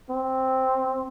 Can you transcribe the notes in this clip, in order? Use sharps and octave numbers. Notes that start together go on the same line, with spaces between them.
C4